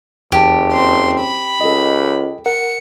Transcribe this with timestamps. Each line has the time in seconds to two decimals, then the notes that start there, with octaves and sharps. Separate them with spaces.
0.32 F#1 E2 G4 A5
0.72 C4 C6
1.20 B5
1.61 C#2 A4 D#5
2.46 A#4 F#5 C#7